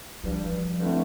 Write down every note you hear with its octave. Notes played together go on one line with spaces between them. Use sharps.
G2 E3 F3 G3
G2 D3 A3 C4 E4